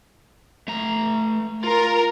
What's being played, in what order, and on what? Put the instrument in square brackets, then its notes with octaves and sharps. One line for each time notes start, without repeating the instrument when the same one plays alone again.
[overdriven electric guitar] A3 A#5
[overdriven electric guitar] F4 [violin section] A#4